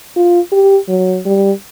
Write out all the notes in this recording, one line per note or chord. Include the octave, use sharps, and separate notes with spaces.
F4
G4
F#3
G3